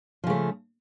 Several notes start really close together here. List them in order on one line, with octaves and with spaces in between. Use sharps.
F3 C#3 A3